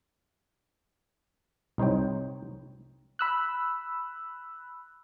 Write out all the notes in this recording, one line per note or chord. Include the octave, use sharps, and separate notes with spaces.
C2 D#4 C5 C#5 G5
B5 E6 F#6